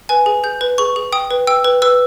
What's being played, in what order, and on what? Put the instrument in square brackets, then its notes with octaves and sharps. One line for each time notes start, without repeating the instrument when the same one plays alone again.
[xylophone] B4 G#5
G#4
G#4 G6
B4
G#4 C#6
G#4
G5 D#6
B4
G5 E6
B4
B4 E6